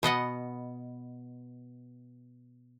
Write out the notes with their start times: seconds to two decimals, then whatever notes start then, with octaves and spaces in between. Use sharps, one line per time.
0.03 B2 B3 D#5 F#5